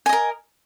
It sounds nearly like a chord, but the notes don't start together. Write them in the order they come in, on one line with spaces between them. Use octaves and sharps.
G#5 D#5 A#4